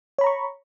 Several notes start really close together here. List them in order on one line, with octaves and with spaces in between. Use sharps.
C#5 B5 A#5 C#6